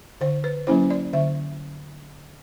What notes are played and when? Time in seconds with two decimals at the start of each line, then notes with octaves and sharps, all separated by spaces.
0.21 D3 C5
0.44 B4
0.67 F#3 A#3 C#4 E4 C5
0.90 D5
1.13 D3 E5